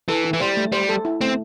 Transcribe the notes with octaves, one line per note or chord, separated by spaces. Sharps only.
E3 A4
E4
E3
G3 C5
A3
G3 C5
A4
E4
A3 C4